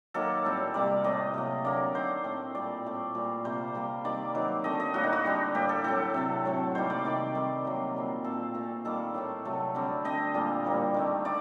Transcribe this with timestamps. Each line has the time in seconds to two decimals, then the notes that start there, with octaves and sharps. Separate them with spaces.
0.14 D#3 F#3 A#3 A4
0.45 A2 G3 C4
0.74 C3 G3 A#3 D5
1.04 A2 A3 C4 D#5
1.34 C3 F#3 A#3
1.65 D3 F#3 A#3 D5
1.94 D#3 A3 C4 C5
2.24 A2 A3 C4
2.55 A#2 G3 C4 D5
2.85 A2 A3 C4
3.15 A#2 G3 C4
3.45 C3 G3 A#3 C5
3.74 C3 G3 A#3
4.04 D#3 G3 C4 D5
4.35 D#3 F#3 C4
4.64 D3 A3 C4 D#5
4.80 D#5
4.94 A2 G3 A#3 F#4
5.04 D#4
5.13 F#4
5.24 D3 G3 C4
5.54 A2 G3 A#3 G4
5.69 A4
5.84 A2 F#3 C4 A4
6.14 C3 F#3 C4
6.45 A2 F#3 A3 C4
6.75 C3 D#3 G3 A#3 C5
6.90 D5
7.04 C3 D#3 A3 C4 D5
7.35 D#3 G3 C4
7.65 C3 F#3 A#3
7.94 A#2 G3 C4
8.24 A#2 A3 C4 A4
8.54 A#2 A3 C4
8.85 D#3 G3 A#3 A4
9.14 A2 A3 C4
9.45 C3 F#3 A3
9.75 D3 G3 C4
10.05 D3 A3 C4 D#5
10.34 A#2 G3 A#3
10.64 A2 G3 A#3
10.94 D#3 A3 C4
11.25 D3 A3 D5